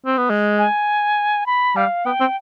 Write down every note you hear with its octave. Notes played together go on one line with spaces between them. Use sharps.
C4
B3
G#3
G#5
B5
G3 F5
B3 G5
C4